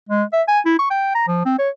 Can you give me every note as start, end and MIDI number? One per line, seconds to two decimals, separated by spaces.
0.09 0.23 56
0.33 0.42 76
0.48 0.60 80
0.65 0.76 64
0.79 0.89 85
0.90 1.12 79
1.15 1.25 82
1.27 1.43 53
1.46 1.55 60
1.59 1.69 73